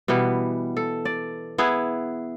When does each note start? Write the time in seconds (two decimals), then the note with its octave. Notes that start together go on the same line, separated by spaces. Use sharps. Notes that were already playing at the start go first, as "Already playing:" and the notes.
0.08 B2 E3 G3 B3
0.77 A4
1.05 D5
1.58 B3 E4 G#4